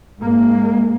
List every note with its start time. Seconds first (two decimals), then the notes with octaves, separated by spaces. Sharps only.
0.19 G#2 G#3 A#3